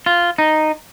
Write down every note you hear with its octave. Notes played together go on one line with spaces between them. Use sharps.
F4
D#4